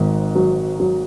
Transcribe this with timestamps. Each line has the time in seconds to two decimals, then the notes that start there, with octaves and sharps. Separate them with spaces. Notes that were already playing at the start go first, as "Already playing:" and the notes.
Already playing: G#1 G#2
0.35 F#3
0.80 F#3